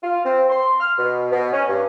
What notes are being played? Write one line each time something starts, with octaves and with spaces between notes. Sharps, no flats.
F4
C4
C6
F6
B2
B2
C#4
G2